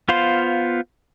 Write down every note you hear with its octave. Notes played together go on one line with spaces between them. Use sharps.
B3 F4 C5 F5 C6